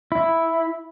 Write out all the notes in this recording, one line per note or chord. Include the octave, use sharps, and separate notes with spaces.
E4